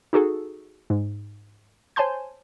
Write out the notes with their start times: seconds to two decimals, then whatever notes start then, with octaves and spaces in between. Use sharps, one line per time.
0.13 D#4 F#4 G#4 A4
0.90 G#2
1.96 C5 C#5 G#5 A5 C6 G6